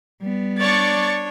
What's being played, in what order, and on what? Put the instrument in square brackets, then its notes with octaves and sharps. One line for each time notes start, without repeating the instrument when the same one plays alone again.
[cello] G3 B3
[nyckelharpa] D4 C#5 [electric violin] D5 [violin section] C#6 A6